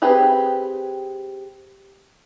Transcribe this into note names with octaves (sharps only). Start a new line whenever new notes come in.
C4 G4 G#4 B4